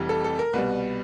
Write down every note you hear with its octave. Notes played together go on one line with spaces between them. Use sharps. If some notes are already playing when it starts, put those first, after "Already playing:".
Already playing: F1 F2 C3 E3 G3
A4
A4
A#4
C2 B2 G3 B4